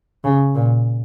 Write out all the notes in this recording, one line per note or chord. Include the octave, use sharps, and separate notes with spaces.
C#3
A#2